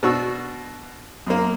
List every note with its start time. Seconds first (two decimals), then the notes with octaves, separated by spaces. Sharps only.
0.03 B2 D4 F#4 C#6 E6
1.27 F#2 A#3